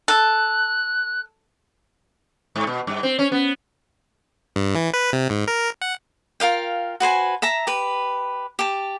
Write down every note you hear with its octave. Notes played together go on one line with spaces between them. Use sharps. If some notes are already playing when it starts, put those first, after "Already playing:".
A4 F#6
G#2
B2
G2
C4
C#4
B3
G2
E3
B4
C3
G#2
A#4
F#5
F4 A#4 F5 G5
F#4 B4 C5 G#5
E5 A5 A#5
G4 B4
G4 A5